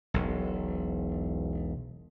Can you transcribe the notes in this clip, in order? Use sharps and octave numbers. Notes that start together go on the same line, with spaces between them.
E1 B1